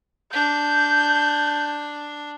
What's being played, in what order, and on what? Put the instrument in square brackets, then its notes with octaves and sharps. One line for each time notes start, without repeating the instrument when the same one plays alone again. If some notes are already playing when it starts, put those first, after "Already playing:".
[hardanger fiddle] D4 [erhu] G6